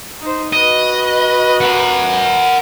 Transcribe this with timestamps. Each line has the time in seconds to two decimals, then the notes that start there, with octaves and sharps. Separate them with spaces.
0.22 D#4 C5
0.53 F#4 B4 D#5
1.61 A#4 F#5